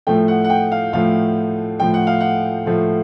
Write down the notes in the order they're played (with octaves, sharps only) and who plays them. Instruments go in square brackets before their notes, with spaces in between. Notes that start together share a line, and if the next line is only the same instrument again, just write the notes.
[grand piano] A2 F3 A3 G5
F#5
F#5
G5
F5
A2 F3 A3 F5
A2 F3 A3 G5
F#5
F5
F#5
A2 F3 A3